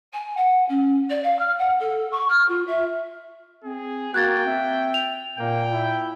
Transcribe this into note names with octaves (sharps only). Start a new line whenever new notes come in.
G#5
F#5
C#4
D5
F5
F6
F#5
A4
C#6
F6
F4
E5
C4 G#4
A#3 F#4 G5 F#6 G#6 A6
C4 E5
F7
A#2 A#3 G5
E4